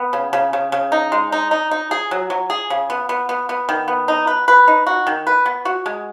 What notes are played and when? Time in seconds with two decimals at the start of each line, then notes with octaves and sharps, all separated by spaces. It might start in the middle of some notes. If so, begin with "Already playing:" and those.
Already playing: B3
0.13 C#3
0.33 C#3
0.53 C#3
0.72 C#3
0.92 D#4
1.12 G#3
1.32 D#4
1.51 D#4
1.71 D#4
1.91 G#4
2.11 F#3
2.30 F#3
2.50 G#4
2.70 C#3
2.90 B3
3.09 B3
3.29 B3
3.49 B3
3.69 D#3
3.88 B3
4.08 D#4
4.27 B4
4.48 B4
4.68 D#4
4.87 F#4
5.07 D#3
5.27 B4
5.46 B3
5.65 F#4
5.86 G#3